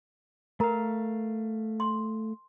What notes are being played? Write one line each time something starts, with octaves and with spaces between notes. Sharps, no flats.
A3 A#4 F5 A#5
C6